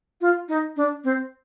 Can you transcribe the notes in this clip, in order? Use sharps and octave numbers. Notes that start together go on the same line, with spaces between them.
F4
D#4
D4
C4